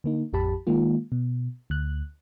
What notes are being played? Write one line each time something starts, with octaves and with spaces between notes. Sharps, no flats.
D3 A#3 D#4
A1 F2 G4 A5 B5
D#3 G#3 A#3 F4
B2
D2 F#6